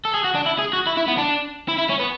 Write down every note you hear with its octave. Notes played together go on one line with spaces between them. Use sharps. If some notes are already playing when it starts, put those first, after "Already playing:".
A4
G#4
F#4
D4
E4
G#4
F#4
E4
E4
B3
D4
E4
E4
C#4
B3